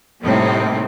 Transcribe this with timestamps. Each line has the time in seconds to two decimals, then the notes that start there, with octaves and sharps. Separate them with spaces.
0.23 A2 C3 G3 A#3 C4 D#4